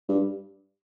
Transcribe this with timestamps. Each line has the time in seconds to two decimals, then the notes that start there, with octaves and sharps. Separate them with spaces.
0.09 G2